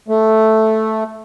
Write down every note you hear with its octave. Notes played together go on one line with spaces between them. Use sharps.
A3